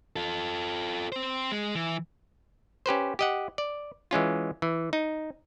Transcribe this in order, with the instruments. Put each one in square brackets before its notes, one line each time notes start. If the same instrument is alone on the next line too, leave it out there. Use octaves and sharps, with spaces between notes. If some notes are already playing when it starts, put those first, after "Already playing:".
[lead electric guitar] F4 A4
C4 C5
G#3
E3
[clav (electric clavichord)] C#4 G4 B4 C5
G4 D#5 F#5
D5
E3 G#3 C#4 F4
E3
D#4